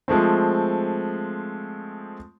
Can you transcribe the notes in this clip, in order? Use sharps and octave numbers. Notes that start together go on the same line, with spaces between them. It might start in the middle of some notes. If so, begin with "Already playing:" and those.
F3 G#3 A3 C4